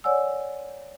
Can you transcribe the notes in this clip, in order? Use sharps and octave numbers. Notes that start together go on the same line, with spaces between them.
C#5 D5 F#5 G#5 E6